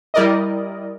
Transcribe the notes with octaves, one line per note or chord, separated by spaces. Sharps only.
G3 E4 A#4 D5 D#5